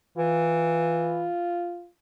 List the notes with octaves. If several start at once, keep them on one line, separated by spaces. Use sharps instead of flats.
E3 F4